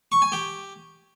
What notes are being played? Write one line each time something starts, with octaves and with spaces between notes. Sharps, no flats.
C#6
G#5
G4